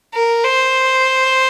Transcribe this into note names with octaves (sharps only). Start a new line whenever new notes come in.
A#4
C5